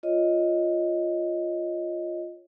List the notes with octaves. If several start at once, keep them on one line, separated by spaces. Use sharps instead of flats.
F4 C#5 D#5